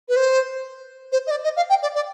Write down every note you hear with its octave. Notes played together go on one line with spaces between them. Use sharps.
B4
C5
C5
D#5
D5
D#5
F5
G5
D5
D5